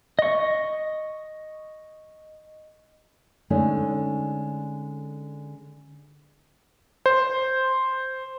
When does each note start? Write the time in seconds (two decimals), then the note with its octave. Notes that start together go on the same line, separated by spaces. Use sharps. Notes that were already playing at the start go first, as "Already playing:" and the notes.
0.19 D#5 C#6
3.50 D3 G#3 A3 C#4 D#4
7.06 C5